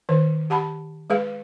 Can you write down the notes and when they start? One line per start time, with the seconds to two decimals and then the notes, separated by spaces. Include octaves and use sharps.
0.09 D#3 C5 C#5
0.50 G4 F#5 A5 B5
1.10 G#3 G#4 B4 F5